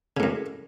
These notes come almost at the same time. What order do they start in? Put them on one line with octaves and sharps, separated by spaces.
C#3 A2 F#2